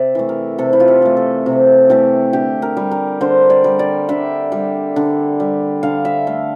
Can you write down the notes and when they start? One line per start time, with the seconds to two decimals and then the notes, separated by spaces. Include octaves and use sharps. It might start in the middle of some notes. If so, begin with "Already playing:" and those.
Already playing: C3 D5 E5
0.15 E3 A3
0.29 A#4
0.58 C3 A4
0.73 E4
0.80 F4
0.88 G4
1.02 E3 A3
1.17 A4
1.46 C3
1.90 E3 A3 G4
2.33 D3 G4
2.62 A#4
2.77 G3
2.91 A#4
3.21 D3 C5
3.50 D5
3.64 G3
3.79 D5
4.09 D3 E5
4.52 G3
4.96 D3
5.40 G3
5.83 D3 F5
6.05 E5
6.27 A3 F5